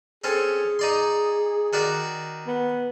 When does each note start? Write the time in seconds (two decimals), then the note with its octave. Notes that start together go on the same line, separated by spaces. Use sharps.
0.24 C4 C#4 G#4 A4
0.79 D#4 D5 C6
1.73 D#3 F#4 D5
2.47 B3